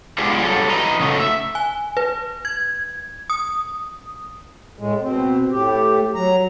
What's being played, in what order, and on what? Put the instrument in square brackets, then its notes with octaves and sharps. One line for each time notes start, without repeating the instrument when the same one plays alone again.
[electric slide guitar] G#3 B3 D4 F4 G4 G#4
F#3 G3 A4
E3 B4 D#5 A#5
C#3 F#3 A3 D#4
E5
[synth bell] G#5
B4
G#6
D#6
[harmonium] A2 G#3
B2 C4
A2 G4
F#3 A#5